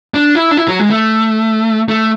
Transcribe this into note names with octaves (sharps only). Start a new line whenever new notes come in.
D4
E4
D4
E4
F#3
G#3
A3
A3